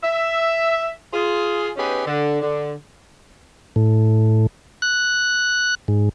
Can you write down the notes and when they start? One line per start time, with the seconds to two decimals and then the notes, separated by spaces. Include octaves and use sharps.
0.02 E5
1.12 F4 G#4
1.77 B3 C#4 D#4 G4 G#4 B4
2.05 D3
2.40 D3
3.76 A2
4.82 F#6
5.88 G#2